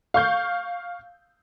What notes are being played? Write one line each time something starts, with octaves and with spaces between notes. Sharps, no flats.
F5 C#6 G6